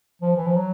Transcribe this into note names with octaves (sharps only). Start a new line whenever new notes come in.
F3
E3
F3
F#3